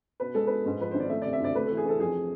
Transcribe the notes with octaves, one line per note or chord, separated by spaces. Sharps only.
B2 B4
G#3 A4
B2 B4
G#2
F3 B4
G#1 C5
D5
A3 E5
C3 D5
E5
D2 D5
A3 B4
E3 A4
G#4
E3 A4
F2 G#4